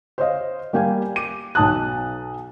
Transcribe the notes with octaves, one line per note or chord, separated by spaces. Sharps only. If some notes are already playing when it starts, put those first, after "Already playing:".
C5 C#5 D#5 F5
G3 A#3 G4 F5 G#5
D6 D#7
B1 D#4 A5 D#6 F#6